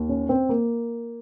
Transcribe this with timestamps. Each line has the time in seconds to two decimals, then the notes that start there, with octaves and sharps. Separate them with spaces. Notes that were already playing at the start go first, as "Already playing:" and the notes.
Already playing: D#2
0.09 C#4
0.29 C4
0.49 A#3